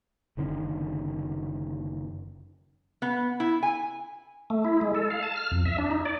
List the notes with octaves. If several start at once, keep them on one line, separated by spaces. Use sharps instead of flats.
F#1 D3 D#3 C#4
B3
E4
G#5
A3
E4
G#3
A4
F5
A5
F6
F2
E5
D4
D#4
D5